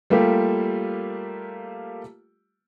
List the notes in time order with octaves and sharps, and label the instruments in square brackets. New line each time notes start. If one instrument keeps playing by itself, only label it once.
[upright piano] G3 A3 A#3 F4 G4